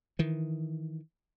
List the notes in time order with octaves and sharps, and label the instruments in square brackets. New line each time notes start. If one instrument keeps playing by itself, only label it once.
[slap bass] D#3 E3